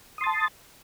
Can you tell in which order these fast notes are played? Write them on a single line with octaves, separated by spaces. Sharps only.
D#6 C6 A6 A5